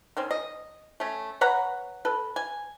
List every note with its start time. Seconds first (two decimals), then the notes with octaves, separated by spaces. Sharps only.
0.17 D#3 C4 C#4
0.31 D#5
1.00 A3 C#4
1.41 B4 C#5 F#5 A#5
2.05 A4 B4
2.36 G#5